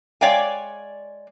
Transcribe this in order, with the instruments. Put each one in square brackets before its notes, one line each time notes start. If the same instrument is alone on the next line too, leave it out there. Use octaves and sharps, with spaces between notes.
[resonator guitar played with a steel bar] G#3 C#5 D5 F5 G5 G#5